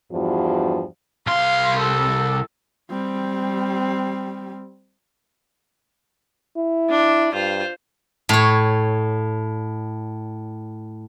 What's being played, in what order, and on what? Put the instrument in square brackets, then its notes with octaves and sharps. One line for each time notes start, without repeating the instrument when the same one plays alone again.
[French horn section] E2 G2 F3 F#4
[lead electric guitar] C2 C6 [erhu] F5
[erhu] A4
[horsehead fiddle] G3 C4
[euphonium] E4
[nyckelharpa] D4
[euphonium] G2 [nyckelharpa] F4 C5
[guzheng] A2 C#5